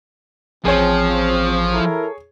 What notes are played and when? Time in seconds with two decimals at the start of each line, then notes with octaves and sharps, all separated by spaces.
0.65 A1 F3 C4 G#4 C#5
1.73 E4 A4 A#4